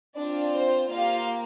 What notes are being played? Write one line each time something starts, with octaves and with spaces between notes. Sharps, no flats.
C4 D4 F4 D5
C5
A#3 F4 G4 F5